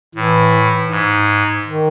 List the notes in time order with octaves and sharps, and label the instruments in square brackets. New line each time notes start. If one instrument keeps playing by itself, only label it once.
[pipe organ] A2 [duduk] E3
[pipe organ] G#2
[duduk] D#3